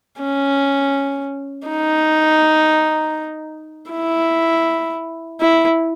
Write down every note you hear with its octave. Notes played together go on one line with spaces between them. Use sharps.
C#4
D#4
E4
E4